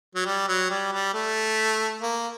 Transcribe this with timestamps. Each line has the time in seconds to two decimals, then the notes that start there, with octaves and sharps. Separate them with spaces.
0.15 F#3
0.26 G3
0.48 F#3
0.70 G3
0.92 G3
1.14 A3
2.02 A#3